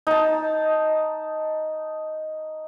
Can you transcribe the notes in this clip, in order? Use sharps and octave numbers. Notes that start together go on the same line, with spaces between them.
D#4 A5